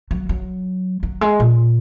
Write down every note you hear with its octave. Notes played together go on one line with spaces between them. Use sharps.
F#3
F#3
F#3
G#3
A#2